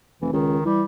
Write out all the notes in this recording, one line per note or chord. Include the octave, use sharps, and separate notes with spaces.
F1 E3
C#2 D#3
E3 G3